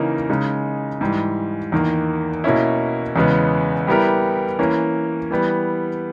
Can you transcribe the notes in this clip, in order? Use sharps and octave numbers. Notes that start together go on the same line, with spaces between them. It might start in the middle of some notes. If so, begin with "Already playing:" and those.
Already playing: C#3 E3 A#3 D#4
C#3 G#3 D#4
G#2 E3 G3
E2 D#3 A#3
B2 A#3 C#4 E4
E2 C#3 G#3 B3
G3 B3 E4 G4 A#4
E3 A#3 C#4
E3 G3 B3